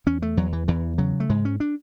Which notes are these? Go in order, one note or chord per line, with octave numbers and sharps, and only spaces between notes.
E2 C#4
A3
E2 F#3
E3
E2 E3
C#3 F#3
A3
G#2 G#3
C#4
D4